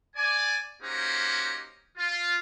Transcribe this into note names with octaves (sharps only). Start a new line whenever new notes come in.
D5 G#5
A#3 C#4 D#4 F#4 G4 C5
F4